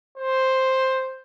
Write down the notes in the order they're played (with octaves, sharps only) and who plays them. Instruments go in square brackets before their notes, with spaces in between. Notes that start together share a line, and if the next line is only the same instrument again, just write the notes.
[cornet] C5